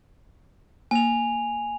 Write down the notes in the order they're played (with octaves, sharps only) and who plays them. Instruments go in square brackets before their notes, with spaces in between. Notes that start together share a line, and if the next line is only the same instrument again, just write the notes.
[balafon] A#3 [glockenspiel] G#5 F7